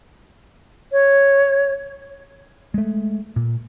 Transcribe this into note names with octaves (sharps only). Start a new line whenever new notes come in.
C#5
G#3 A3
A#2